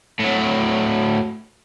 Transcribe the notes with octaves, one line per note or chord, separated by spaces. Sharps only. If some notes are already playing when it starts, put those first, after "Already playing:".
A2 F#3